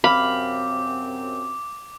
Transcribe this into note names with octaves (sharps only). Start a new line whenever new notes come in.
F#2 C3 C4 F5 B5 D6